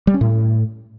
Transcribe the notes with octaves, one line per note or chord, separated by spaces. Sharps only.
G3
C#4
A2